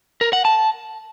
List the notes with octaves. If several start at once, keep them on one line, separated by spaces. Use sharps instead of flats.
A#4
F#5
A5